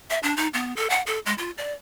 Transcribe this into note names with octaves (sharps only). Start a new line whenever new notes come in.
E5
D4
D#4
B3
A4
F#5
A4
G#3
F4
D5